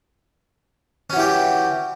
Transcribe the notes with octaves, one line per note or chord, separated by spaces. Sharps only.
E3 F#3 C#4 G4